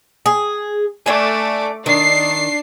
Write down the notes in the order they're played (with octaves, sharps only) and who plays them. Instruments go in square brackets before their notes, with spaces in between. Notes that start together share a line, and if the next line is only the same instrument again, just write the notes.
[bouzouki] G#4
[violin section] A3 D6 [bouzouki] D4 G#5
[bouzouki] D#3 [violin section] D4 C7